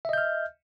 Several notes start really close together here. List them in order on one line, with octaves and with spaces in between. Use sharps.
E5 D#5 G6 F6